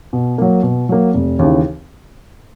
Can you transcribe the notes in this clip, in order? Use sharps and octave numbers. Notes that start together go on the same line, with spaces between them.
B2
F#3 A#3
B2
F#3 A#3
F1
D#2 C#3 E3